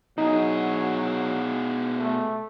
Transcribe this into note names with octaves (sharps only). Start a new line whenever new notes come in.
B2 F#3 D#4 G#4
A3